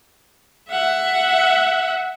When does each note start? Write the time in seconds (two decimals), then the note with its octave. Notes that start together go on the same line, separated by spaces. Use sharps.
0.69 E5 F#5